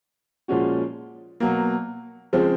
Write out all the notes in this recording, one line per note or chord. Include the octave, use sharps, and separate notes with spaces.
A#2 F3 G#3 C#4 F#4
B2 F#3 A#3
C#3 F3 G#3 C4